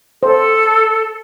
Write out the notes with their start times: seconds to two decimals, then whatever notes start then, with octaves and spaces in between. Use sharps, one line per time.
0.23 A4 C5